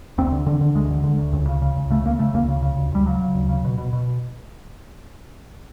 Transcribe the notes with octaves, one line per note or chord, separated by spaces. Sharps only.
D2 C4
D3
D3
D3
D2 G#3
D3
D3
D2
C#2
C#3
C#3
C#2
C#3 A3
C#3 A#3
C#3 A3
C#2 A#3
C#3
C#3
D2
D2 G3
C#3 F#3
C#3
D2
C#3
B2
B2
B2